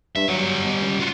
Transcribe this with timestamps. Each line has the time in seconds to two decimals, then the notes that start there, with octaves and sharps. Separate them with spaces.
0.16 G2 E5
0.28 F#3 G3 F#5
0.65 B2
0.81 C#2
1.00 F4 F#4